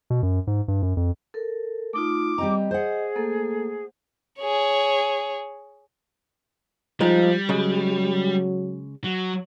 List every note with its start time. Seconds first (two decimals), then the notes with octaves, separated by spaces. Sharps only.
0.10 B2
0.23 F#2
0.47 G#2
0.68 G2
0.83 F#2
0.97 F2
1.34 A4 A#4
1.93 A3 D#4 F4 D6
2.38 G3 C4 D#5 A#5
2.71 G#4 C5 F#5
3.15 A3 A#3 A4
4.41 G#4 C#5
7.01 F3 G3 G#3 D#4 F4
7.49 C#3 F#3 G#3
9.04 F#3